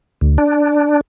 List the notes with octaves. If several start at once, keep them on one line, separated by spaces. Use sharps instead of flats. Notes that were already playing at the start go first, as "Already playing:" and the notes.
D2
D4